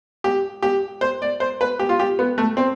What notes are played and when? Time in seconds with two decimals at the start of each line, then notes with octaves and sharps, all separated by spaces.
0.24 G4
0.62 G4
1.01 C5
1.22 D5
1.40 C5
1.61 B4
1.79 G4
1.89 F4
1.99 G4
2.19 B3
2.38 A3
2.57 C4